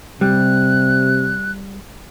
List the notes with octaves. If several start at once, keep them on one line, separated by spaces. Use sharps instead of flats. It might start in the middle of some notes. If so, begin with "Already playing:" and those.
C3 G3 F#6